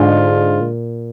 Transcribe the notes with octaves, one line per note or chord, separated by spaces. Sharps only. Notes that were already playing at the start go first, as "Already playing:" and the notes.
Already playing: G#2 D3 G#3 D4 F4
A#2